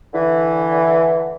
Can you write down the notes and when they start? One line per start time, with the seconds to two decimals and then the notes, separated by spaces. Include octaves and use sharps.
0.14 D3 E3